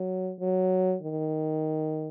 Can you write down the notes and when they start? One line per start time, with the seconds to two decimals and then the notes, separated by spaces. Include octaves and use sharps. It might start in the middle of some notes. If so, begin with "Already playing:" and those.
Already playing: F#3
0.40 F#3
1.02 D#3